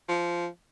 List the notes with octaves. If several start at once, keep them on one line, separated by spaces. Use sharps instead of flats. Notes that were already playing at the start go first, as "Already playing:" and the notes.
F3